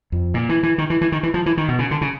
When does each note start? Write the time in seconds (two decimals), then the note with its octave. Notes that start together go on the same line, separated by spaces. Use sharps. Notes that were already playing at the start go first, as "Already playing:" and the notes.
0.12 F2
0.34 A#2
0.49 E3
0.63 E3
0.78 D#3
0.90 E3
1.01 E3
1.12 D#3
1.23 E3
1.34 F3
1.46 E3
1.57 D#3
1.68 B2
1.79 C#3
1.91 D3
2.01 C#3